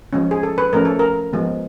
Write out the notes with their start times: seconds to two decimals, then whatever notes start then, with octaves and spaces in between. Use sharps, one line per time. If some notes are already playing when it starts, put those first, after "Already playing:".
0.13 F3 G#3 C#4
0.31 G#4
0.43 A4
0.58 B4
0.73 F3 A3 C#4 A#4
0.85 A4
0.99 A#4
1.33 F3 G#3 B3